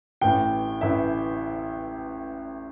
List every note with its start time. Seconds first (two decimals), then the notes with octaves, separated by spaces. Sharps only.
0.21 A1 A2 E3 G5
0.81 A1 A2 E3 E5